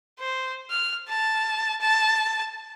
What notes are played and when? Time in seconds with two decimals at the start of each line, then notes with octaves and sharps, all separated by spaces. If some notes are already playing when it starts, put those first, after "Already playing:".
0.20 C5
0.70 F6
1.09 A5
1.81 A5